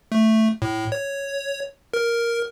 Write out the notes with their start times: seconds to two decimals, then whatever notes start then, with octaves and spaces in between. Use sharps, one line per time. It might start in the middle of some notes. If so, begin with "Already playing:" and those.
0.12 A3
0.62 A2
0.92 C#5
1.94 A#4